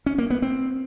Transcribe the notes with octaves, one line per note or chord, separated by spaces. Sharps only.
C#4
A#3
B3
C4